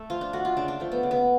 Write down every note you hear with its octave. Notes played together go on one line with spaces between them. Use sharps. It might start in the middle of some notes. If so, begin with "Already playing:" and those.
Already playing: A3 A4
F3 F4
D4
A3 F#4
F4
C#3 D4
D4
F3 A3
B3
C#3
B3